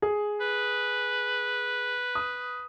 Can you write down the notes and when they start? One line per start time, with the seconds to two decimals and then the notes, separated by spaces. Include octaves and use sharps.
0.02 G#4
0.41 B4
2.15 D#6